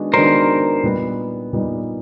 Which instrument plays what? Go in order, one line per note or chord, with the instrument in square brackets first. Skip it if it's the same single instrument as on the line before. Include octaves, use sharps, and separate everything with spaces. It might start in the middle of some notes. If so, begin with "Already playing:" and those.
Already playing: [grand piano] D#3 G#3 B3 D4 F#4
[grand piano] D#3 G#3 B3 D4 F#4 [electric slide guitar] A#4 C5
[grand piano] A#2 G3 B3 D#4
A#2 G3 B3 D#4